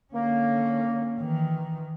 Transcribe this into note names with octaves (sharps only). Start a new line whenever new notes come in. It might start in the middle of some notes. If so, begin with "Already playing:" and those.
D3 A#3 C#4
D#3 E3